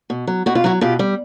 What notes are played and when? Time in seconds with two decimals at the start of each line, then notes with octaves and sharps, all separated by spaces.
0.10 B2
0.27 F#3
0.46 B2 F#4
0.55 F4
0.64 F#3 E4 F#4
0.81 B2 F4 G4
0.99 G3